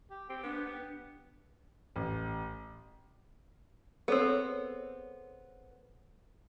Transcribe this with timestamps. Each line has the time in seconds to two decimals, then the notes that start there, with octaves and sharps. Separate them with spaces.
0.10 G4
0.30 C4 G4
0.44 B3 D4
0.67 B3
1.96 A1
4.08 B3 C4 G#4 A4 C#5